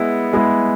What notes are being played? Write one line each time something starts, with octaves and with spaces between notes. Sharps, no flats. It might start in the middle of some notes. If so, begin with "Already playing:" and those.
Already playing: G#3 B3 E4 G#4
G#3 B3 E4 G#4